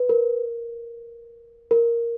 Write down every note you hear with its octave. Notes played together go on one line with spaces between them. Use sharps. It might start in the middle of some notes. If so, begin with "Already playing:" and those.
Already playing: B4
A#4
A#4